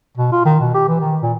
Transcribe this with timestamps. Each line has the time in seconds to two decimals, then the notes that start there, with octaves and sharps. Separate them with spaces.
0.18 B2
0.32 F4
0.45 D#3
0.60 B2
0.74 G4
0.88 E3
1.00 D#3
1.22 A#2